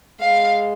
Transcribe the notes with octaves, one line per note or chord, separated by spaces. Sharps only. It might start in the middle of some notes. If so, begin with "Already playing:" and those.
G#3 F5